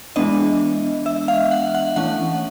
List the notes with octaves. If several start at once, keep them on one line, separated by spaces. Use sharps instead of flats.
E3 G#3 B3 D4 D#5
E5
F5
F#5
F#5
E3 A3 C#4 F#5